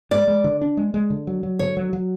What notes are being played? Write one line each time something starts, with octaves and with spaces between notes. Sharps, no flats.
G#3 D5
G#3
D3
D4
G#3
G#3
D3
F#3
F#3
D3 C#5
F#3
F#3